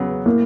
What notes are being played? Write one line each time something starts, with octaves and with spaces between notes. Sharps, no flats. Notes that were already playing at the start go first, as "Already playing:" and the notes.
Already playing: E2 C#3 F#3 B3
A2 A#3